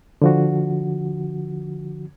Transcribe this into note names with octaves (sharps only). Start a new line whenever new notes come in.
D3 F3 F#4